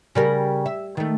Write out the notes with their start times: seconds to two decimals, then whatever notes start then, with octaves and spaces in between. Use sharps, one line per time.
0.15 C#3 G3 A#4
0.66 E5
0.97 D#3 A3